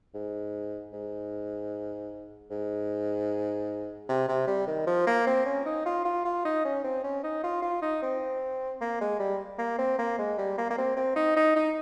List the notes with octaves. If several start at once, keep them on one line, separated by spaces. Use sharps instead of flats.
G#2
G#2
G#2
C3
C3
G3
D#3
F3
A#3
C4
C#4
D#4
F4
F4
F4
D#4
C#4
C4
C#4
D#4
F4
F4
D#4
C4
A#3
G#3
G3
A#3
C4
A#3
G#3
G3
A#3
A#3
C4
C4
D#4
D#4
D#4